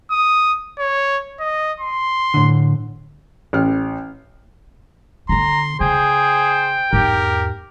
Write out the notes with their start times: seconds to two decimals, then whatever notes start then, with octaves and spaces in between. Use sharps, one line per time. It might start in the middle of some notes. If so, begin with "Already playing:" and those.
0.11 D#6
0.79 C#5
1.40 D#5
1.80 C6
2.34 A2 D3
3.53 A1 F6
5.29 D3 B3 A#5 C6
5.80 C#3 G#4 C5 G5
6.93 E2 G#2 G4 A#4